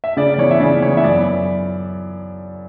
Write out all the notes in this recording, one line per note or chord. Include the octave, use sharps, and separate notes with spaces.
E5
C#3 D5
D5
E3 B3 C#5
E5
C#3 D5
E3 B3 C#5
E5
F#2 D5